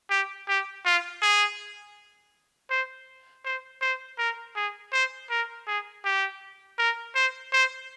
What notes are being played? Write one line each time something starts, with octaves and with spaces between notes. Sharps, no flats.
G4
G4
F4
G#4
C5
C5
C5
A#4
G#4
C5
A#4
G#4
G4
A#4
C5
C5